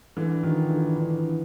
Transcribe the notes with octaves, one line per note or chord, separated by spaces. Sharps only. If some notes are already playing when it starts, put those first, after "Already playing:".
D3 E3
D#3 F3
D3 E3
D3 E3